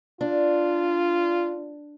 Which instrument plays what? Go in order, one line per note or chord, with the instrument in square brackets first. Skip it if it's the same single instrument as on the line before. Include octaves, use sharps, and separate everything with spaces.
[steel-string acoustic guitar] D4 [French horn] F4